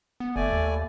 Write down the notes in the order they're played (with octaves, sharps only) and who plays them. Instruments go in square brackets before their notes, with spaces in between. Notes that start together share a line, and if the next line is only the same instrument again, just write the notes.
[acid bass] B3
[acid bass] G1 [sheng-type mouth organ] A3 D5 G#5
[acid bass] D#2